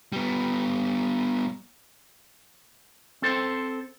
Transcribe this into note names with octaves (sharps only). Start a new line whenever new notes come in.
G3 B3
C4 A4 C5